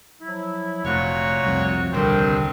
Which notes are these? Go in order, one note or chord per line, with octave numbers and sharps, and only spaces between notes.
F3 F#3 E4
F1 A#2 A3 F#4 C#5
C2 F2
D#1 C2 G2 D3 C4 A#4 G5